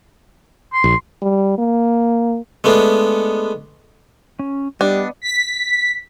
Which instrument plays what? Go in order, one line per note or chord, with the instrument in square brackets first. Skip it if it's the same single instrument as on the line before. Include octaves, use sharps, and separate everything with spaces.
[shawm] C6
[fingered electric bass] A#1
[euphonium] G3
A#3
[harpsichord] G#3 A3 B3 D4
[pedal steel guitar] C#4
[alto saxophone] G3 [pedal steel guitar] B3 D#5 [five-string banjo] D4
[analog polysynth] B6